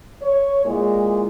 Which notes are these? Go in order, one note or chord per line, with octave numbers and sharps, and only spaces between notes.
C#5
A#2 G#3 E4